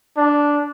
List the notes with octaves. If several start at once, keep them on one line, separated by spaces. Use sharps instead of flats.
D4